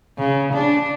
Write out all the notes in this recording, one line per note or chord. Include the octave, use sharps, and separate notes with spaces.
C#3
D4